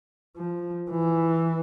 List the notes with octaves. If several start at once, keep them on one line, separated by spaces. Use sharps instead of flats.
F3
E3